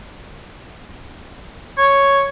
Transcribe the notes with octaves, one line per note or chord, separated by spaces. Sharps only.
C#5